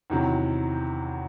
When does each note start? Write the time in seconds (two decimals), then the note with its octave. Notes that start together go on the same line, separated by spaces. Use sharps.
0.10 E2 C3 D#3 F#3